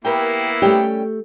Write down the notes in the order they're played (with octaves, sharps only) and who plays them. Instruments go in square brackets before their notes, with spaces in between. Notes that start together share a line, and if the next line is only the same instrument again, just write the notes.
[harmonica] A#3 B3 E4 [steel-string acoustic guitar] G4 A#4 G5
[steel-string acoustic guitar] G3 C#4 G5 [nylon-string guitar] A3 G4